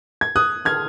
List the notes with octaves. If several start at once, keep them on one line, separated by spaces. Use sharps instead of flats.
G#6
D#6 F#6
F6 G#6